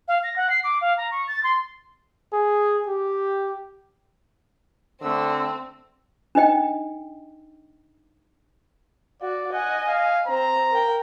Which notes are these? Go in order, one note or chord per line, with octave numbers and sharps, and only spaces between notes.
F5
A#6
F#5
C7
D6
F5
A#5
C#6
A6
C6
G#4
G4
D3 A3 C4 E6
D4 D#4 D#5 G5
F#4 D5
D#5 F#5 G#5
F5
C4 A#5
A#4 G5